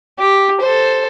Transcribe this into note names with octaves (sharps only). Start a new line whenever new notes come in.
G4
A4 C5